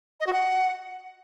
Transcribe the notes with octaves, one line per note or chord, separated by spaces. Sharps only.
D#5
F#4
F#5